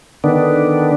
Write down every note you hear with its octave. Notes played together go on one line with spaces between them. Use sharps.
D3 D#3 B3 D4